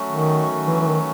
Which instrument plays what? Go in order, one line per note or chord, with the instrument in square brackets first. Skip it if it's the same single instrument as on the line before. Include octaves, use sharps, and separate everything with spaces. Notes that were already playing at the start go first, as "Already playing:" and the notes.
Already playing: [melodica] F#3 A3 C#4 F#4
[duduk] D#3
E3
E3
D#3